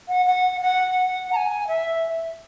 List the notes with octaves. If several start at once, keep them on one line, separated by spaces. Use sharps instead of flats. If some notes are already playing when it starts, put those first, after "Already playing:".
F#5
F#5
F#5
A#5
G#5
E5